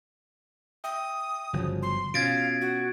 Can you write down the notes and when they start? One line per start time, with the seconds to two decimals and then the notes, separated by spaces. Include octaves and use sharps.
0.84 E5 G5 D#6
1.53 G1 C#3 F3 F#3
1.82 C6
2.14 B2 C#4 F4 F5 G#6 A6 D7
2.61 F#4